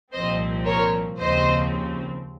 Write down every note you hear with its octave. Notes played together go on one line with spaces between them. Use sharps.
C2 A#2 F3 C4 C5 D#5
A#4 C#5
D#2 C#3 F3 C4 C5 D#5